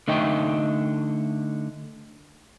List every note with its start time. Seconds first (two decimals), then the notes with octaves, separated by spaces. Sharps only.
0.08 D3 A3 D#4 D#5 E5 G5